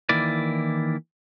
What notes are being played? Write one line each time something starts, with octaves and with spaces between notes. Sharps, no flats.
D#3 E3 A#3 E4 D5